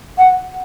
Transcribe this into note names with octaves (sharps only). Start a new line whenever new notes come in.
F#5